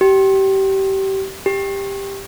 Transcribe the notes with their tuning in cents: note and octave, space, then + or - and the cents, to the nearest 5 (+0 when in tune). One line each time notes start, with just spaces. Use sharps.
G4 -25
G4 +10